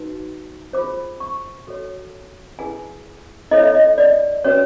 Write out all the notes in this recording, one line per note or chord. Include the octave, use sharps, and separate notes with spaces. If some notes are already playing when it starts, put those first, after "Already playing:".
Already playing: D#4 F#4 B4
F4 G#4 C5 D6
C#6
F#4 A4 C#5
E4 G#4 B4 G#5
E4 A4 C#5 D#5
E5
D#5
D5
C#4 F#4 B4 C#5